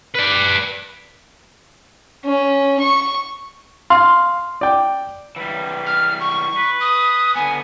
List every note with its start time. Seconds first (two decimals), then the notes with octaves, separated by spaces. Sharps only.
0.15 B4 D5
2.24 C#4
2.80 C#6
3.90 F5 C6
4.61 D5 G5
5.36 E3 G3
5.86 F6
6.20 C#6
6.57 B4
6.80 D#6
7.35 D3 B3 G#5